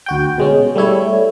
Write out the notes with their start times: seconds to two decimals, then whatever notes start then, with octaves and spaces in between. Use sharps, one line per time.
0.06 D2 F#4 G5
0.38 B2 G#3 C#4
0.75 G3 A3 E4 C#5